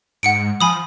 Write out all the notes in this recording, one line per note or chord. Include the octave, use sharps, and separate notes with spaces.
G#2 F#5 C#7 D7
F3 G#5 B5 D#6